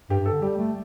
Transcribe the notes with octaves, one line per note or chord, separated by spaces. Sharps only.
G2 G4
G2
A4
D3
G3 G4
A3